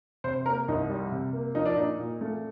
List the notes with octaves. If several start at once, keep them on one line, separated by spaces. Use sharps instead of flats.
C3 C5
A#3 A#4
C2 D#4
G3
C3
A#3
F3 D#4
D4
A#2 D#4
A#2
A3